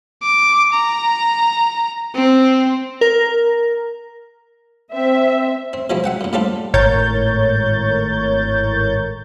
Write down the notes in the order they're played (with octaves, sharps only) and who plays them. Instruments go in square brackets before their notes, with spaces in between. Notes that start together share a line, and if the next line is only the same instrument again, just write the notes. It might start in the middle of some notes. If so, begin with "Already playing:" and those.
[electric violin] D6
A#5
C4
[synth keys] A#4
[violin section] C4 [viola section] E5
[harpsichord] C4
B2 E3 F3 G3 G#3 C4
E5 F#5 G5
F#2 A#2
A2 G3 C4 D4 F4 A4
[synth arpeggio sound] G#1 A2 A#4 C#5 G6 A6